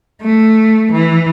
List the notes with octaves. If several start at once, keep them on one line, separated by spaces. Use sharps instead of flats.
A3
E3